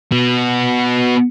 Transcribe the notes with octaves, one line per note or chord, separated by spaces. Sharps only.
B3 F#4